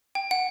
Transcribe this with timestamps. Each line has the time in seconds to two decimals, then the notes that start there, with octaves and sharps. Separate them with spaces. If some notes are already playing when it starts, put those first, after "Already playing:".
0.15 G5
0.31 F#5